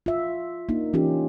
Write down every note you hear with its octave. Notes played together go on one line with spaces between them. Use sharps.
F4 E5
A#3 D4 D#4
E3 C#4 D#4 F4 G4